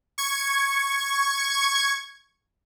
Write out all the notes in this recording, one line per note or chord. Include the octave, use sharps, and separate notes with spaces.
C#6 G#6